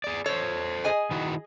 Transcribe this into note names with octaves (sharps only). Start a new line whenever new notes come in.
G#4 D5
A4 C5 C#5
G#4 D#5 G#5
D#3 E4 F#4